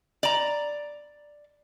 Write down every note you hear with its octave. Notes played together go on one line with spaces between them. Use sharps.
D5 A#5